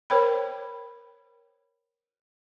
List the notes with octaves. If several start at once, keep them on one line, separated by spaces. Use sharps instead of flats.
A#4 C5 C#5 G5 B5